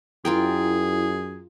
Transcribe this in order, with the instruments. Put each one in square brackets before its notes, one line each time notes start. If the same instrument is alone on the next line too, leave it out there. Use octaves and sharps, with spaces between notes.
[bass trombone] F#2 [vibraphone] E4 [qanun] F4 A#4 G5 [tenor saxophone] G#4